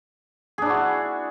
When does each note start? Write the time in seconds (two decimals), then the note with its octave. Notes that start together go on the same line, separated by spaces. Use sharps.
0.58 G#4
0.62 D4
0.66 E4
0.70 F#4